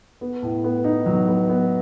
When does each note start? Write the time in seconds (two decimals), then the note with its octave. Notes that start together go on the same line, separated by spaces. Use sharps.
0.21 B3
0.42 A2
0.64 B3
0.84 D#4
1.06 F#3
1.28 B3
1.49 B3